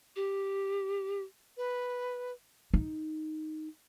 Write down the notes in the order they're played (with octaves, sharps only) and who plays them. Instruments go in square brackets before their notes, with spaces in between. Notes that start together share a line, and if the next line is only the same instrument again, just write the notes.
[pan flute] G4
[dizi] B4
[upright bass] D#4